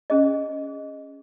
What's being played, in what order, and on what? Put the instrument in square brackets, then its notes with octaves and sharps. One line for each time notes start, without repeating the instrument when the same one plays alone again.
[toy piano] C#4 G#4 D#5